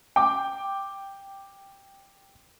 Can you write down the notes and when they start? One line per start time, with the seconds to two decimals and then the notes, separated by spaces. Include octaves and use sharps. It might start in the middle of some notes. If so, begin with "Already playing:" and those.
0.16 G5 D6